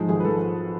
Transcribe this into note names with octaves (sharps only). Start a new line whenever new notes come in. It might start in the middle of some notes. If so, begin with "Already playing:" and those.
Already playing: G#2 F3 G#3 C5
G#1 G#4
B4
F3 G#3 A4